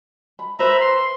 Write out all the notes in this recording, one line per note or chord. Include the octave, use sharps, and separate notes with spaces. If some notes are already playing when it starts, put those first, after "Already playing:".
B5
B4 C5 E5 A#5 B5
C6